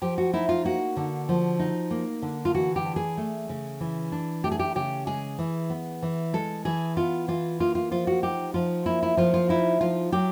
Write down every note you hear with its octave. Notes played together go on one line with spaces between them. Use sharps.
F3 G4
F#4
D#4 E4
F4
A#3 F#4
D3
F3
D#4
A#3
D3
F4
E3 F#4
G4
D4
G#4
A3
C#3
E3
D4
A3 G4
G#4
G4
C#3 G4
G#3 G#4
E3
B3
E3
G#3 A4
E3 G#4
B3 F4
E3 F4
A#3 F4
F4
F3 F4
F#4
D#4 G4
F3 F4
A#3 E4
E4
F3 F4
F4
D#4 E4
F3 F4
F#3 G4